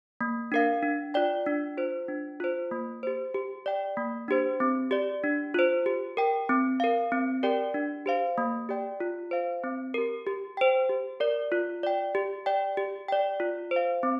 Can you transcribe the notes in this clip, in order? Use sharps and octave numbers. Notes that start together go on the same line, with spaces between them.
A#3
D4 A#4 F5
D4
F4 D5 G5
D4
F4 C5
D4
F4 C5
A#3
G4 C5
G4
D5 G5
A#3
D4 G4 C5
C4
G4 D5
D4
F4 C5
G4
A#4 G5
C4
A#4 F5
C4
G4 A#4 D5 G5
D4
G4 C5 F5
A#3
G4 D5 G5
F4
C5 F5
C4
G4 A#4
G4
C5 G5
G4
A#4 D5
F4
D5 G5
G4
D5 G5
G4
D5 G5
F4
C5
F5
C4